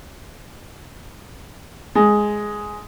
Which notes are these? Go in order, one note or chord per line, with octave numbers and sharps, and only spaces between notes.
G#3